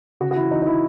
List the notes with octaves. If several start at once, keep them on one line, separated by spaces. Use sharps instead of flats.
C#3 F#4
F#4
E3 E4
E3 D#4
D#4
E3 E4